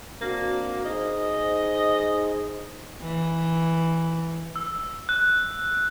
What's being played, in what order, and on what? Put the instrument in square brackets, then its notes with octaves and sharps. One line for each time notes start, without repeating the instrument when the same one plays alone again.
[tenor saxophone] A#3 [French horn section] C4 D4 F#4
[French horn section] D#4 G#4 C5 [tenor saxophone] D#5
[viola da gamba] E3
[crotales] E6
F#6